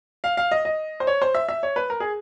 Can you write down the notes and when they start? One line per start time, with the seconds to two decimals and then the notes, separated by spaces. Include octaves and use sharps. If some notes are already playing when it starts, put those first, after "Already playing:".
0.24 F5
0.37 F5
0.51 D#5
0.65 D#5
1.00 C5
1.07 C#5
1.22 C5
1.35 E5
1.49 E5
1.63 C#5
1.76 B4
1.90 A#4
2.00 G#4